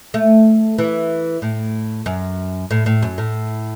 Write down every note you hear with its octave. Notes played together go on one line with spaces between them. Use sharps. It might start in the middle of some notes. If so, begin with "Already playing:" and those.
A3
E3
A2
F#2
A2
A2
F#2
A2